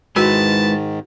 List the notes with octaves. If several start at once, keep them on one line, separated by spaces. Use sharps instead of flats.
G#2 D#3 G#3 E4 F#4 B4 A5